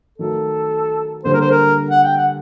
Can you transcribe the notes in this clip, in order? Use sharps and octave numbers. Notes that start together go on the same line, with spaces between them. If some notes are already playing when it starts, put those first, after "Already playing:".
D#3 F#3 A3 A4
D3 G3 A#3 C5
A#4
C5
A#4
F#5
G5
F#5